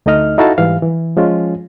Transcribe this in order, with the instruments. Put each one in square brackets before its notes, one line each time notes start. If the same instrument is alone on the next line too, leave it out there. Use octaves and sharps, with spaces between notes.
[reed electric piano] D2 A3 D#4 D#5 F6
D#4 E4 F#4 A4 F5 A5
G#2 E3 G3 F5
E3
F3 G#3 C#4 F4